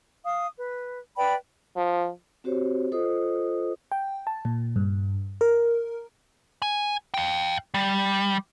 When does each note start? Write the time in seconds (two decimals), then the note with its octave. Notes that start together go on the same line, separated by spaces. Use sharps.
0.24 F5 D#6
0.57 B4
1.16 B4 D5 G5 B5
1.77 F3
2.44 C4 F#4 G4 C5 C#5
2.92 F4 A4 C5 D#5 D#6
3.92 G5
4.27 A5
4.45 A#2
4.76 G2
5.41 A#4
6.62 G#5
7.14 F5 G5
7.74 G3